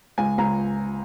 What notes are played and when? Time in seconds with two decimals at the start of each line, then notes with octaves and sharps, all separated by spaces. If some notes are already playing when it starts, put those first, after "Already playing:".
0.18 C#2 G#5
0.38 C#2 A#5